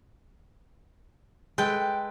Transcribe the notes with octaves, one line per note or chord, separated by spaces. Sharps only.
G#3 A4 B4 G5